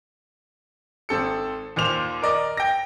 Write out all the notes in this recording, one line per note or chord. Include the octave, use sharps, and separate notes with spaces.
G#1 C4 A4 C#7
D#2 A#2 C5 F7
A#4 D5 D#5
G5 A#6